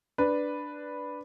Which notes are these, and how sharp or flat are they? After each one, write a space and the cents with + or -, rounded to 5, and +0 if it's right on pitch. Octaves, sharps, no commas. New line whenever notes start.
D4 +0 B4 +0